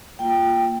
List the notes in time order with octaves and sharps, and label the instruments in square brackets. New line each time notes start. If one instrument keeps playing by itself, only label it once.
[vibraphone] A#3 F4 G5